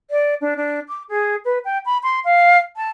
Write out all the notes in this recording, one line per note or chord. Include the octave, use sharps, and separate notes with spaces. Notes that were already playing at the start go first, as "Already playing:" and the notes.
D5
D4
D4
D6
G#4
B4
G5
B5
C6
F5
A5